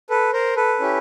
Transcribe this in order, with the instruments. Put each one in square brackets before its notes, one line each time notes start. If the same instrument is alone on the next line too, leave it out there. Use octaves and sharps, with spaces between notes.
[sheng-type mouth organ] A4 B4
A#4 C5
A4 B4
C#4 E4 G4